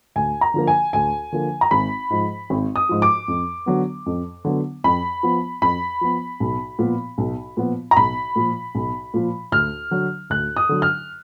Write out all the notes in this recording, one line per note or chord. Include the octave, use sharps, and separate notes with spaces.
D2 G#5
A#5
D3 F3 A#3
G#5
D2 G#5
D3 F3 A#3
A#5
G#1 B5
G#2 F3
G#1
D#6
G#2 F3
D6
F2
D3 F#3 B3
F2
D3 F#3 B3
F2 B5
F3 B3
F2 B5
F3 B3
B1
A#2 F3 B3
B1
A#2 F3 B3
A#5
B1 B5
A#2 F3
B1
A#2 F3
D2 F6
D3 F#3
D2 F#6
D#6
D3 F#3
F6